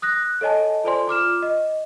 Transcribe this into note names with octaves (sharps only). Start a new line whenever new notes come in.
D#6 F#6 A#6
A4 C#5 D#5 G#5 A5
F4 A4 C5 D5 G#5 C6
F4 D6 F6 E7
D#5